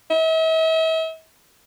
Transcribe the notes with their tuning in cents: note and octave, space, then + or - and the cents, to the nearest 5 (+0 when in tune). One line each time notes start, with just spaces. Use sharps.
E5 -40